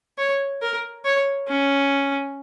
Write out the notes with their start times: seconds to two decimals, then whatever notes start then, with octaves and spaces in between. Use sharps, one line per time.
0.18 C#5
0.62 A#4
1.05 C#5
1.48 C#4